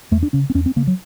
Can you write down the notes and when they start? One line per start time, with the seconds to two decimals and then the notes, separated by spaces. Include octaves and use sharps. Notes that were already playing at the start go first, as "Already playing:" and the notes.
0.11 E2 A3
0.23 D4
0.33 C#3 C#4
0.50 C4
0.54 E2 C#4
0.66 C4
0.76 C#3 A#3
0.87 F#3